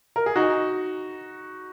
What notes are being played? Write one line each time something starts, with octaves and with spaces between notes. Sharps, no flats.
A#4
G#4
D#4 F#4